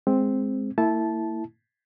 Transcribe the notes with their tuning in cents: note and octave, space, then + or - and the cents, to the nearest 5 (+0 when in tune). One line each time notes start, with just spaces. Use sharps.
G#3 +0 C4 +0
A#3 -45 E4 +0 A5 -15